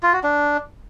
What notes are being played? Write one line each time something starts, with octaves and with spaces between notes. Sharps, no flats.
F4
F#4
D4